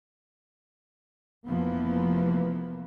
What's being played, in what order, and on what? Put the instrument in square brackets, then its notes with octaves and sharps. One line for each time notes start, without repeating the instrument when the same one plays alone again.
[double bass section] F1 F2 E3 F3 A#3 B3